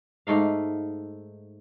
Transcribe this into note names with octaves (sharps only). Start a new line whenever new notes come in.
G#2 A3 D#4 F5